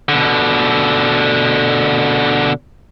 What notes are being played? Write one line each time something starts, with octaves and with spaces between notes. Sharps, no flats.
B2 D3